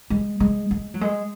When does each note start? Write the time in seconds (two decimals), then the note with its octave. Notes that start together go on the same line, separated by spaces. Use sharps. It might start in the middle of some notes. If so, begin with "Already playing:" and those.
0.10 G#3
0.40 G#3
0.71 G#3
0.94 F#3
1.01 G#3